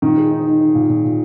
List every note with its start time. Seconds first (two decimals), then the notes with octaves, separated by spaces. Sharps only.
0.02 A#2 D#3
0.18 G#3
0.31 D#4
0.46 D#4
0.61 D#4
0.75 A#2
0.89 A#2
1.05 A#2